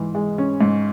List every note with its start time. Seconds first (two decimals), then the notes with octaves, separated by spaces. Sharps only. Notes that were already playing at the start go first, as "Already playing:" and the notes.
Already playing: G#2 E3
0.15 G#3
0.38 C#4
0.61 G#2